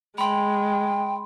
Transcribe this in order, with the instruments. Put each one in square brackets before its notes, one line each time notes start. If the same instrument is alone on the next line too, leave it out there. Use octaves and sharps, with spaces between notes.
[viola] G#3 [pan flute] G5 [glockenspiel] B5 C6